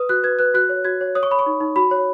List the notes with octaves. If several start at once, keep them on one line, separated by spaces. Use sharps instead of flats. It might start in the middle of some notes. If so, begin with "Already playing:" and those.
Already playing: B4 D#6
F#4 F#6
B4 G#6
B4 F#6
F#4 F#6
C#5
F#4 G#6
C#5
C#5 D#6
C#6
C#5 B5
C#6
D#4
D#4
F#4 B5
C#5